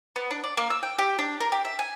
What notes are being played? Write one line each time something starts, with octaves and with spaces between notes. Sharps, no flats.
B3
D4
D5
A#3
E6
G5
G4
D4
A#4
G4
E5
G#5